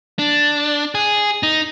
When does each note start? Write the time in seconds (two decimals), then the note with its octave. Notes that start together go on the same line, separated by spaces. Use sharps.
0.19 D4
0.95 G#4
1.43 D#4